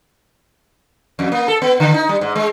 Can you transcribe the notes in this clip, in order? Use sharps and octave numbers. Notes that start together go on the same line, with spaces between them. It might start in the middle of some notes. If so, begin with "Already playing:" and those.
F2
A#3
A4
B3
D3
D#4
G3
G#2
G#3